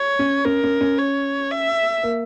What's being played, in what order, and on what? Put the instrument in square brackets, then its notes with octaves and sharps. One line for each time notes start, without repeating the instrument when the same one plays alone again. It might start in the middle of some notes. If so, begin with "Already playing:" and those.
Already playing: [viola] C#5
[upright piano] C#4
[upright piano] C#4 [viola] A#4
[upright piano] C#4
C#4
[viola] C#5
E5
[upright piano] A#3